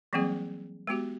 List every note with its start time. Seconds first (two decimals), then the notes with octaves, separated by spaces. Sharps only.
0.13 E3 F#3 G3 A#3 C4 G#4
0.87 G#3 B3 F#4 G4